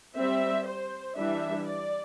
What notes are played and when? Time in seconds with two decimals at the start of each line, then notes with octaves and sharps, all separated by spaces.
0.16 G3 C4 E5
0.66 C5
1.17 E3 G3 D4 E5
1.67 D5